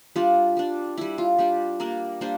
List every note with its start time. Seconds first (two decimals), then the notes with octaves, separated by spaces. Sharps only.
0.16 G3 D4 F4
0.57 G3 D4
0.98 G3 D4 E4
1.18 F4
1.38 G3 D4 G4
1.80 G3 A#3 D4 A#4
2.21 G3 A#3 D4 C5